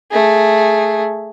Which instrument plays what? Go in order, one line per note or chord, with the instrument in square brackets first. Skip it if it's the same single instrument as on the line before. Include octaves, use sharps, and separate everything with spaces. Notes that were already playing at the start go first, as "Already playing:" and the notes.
[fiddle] A3 G#4